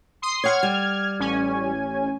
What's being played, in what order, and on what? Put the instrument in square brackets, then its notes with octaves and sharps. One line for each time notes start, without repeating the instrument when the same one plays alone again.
[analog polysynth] C6 D#6 C7
[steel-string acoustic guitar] C#5 F#5 [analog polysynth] F6 G#6
[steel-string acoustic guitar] G3
[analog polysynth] A1 C#4 G#5